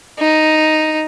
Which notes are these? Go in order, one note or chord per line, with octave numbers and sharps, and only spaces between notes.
D#4